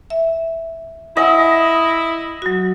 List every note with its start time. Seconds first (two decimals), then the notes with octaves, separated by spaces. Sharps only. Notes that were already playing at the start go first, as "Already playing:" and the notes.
0.10 E5
1.17 E4 D#5 F#5 G#5
2.42 F#3 F#4